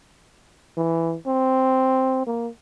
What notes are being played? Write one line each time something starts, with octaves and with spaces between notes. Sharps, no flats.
E3
C4
A#3